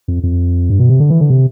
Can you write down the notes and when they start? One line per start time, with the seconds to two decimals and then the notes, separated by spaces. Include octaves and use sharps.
0.08 F2
0.23 F2
0.70 G2
0.79 B2
0.89 C3
1.00 D3
1.10 E3
1.20 D3
1.30 C3